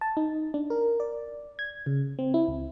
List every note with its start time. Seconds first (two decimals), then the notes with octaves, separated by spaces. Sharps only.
0.01 A5
0.17 D#4
0.54 D4
0.70 A#4
1.00 D5
1.59 G#6
1.86 C#3
2.19 C4
2.34 E4
2.48 C#2